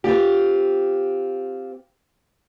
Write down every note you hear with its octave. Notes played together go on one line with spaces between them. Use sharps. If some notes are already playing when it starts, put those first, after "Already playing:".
C4 F4 G4